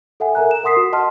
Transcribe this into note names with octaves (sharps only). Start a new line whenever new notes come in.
A4 E5 F#5 G#5
A4 A#4 E5 G#5 A#5 F#6
E7
A#4 F#5 C6 D#6 B6 C7
F#4
D#5 F#5 A5 C6 F6